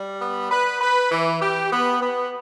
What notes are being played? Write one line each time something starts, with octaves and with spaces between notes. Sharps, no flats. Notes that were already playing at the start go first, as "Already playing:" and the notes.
Already playing: G3
B3
B4
B4
E3
G4
B3
B3